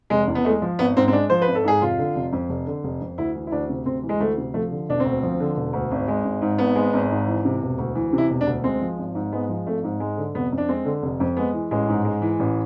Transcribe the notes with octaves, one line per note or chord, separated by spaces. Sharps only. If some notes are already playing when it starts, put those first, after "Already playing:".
F1 G#3
E2
B3
G#3 A3
F3
G#1 B3
G#2 C4
C4
G#3 D4
F3 C5
B4
G#1
A4
G#2 G#4
F1 F4
D3
F1
F2
F1
D3
F1
F2
D2 E4
E3
E4
D2 D4
C3
D2 C4
E3
G#3
D2 A3
C3
F3 A3
D3
E1 D4
C4
D2
F3
D3
E1
D2
G#1
G#3
G#1
G#2
G#1 B3
G#3
G#1
G#2
E3
C3
E1
D2
E3
C3
E4
E1
D4
D2
G#3 C4
F3
G#1
G#2
G#3 B3
F3
G#1 A3
G#2
G#3
D3
F1 B3
F2
D4
G#3 C4
D3
F1
F2
G#3 B3
E3
A1 G#3
G#2
G#3
E3
A1